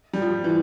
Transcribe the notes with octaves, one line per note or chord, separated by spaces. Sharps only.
G3
F3
E3